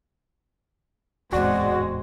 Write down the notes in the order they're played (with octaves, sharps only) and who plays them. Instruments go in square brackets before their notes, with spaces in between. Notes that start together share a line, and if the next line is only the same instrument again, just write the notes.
[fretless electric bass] D1 E2 [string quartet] G#2 G#3 C4 [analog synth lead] F#4 [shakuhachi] D5